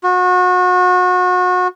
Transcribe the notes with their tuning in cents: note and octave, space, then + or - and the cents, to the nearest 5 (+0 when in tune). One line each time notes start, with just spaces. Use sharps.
F#4 -30